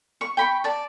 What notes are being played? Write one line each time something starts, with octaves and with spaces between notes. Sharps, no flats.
C#6
G5 B5 C#6
D5 A5